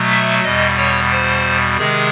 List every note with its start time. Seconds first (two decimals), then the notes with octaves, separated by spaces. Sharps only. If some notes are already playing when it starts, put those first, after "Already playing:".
Already playing: B2 F#3 A3
0.12 E5
0.44 E2 B2 G3 D#5
0.77 C#5
1.11 C5
1.78 C3 D#3 G#3 G#4